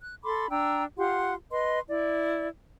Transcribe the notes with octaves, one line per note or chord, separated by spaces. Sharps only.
F#6
A4 B5 C6 D6
D4 G5 A#5 E6
F4 G4 F#5 C6
B4 D#5 C6
E4 D5